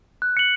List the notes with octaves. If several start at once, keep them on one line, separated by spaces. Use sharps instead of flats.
F#6
C#7 F#7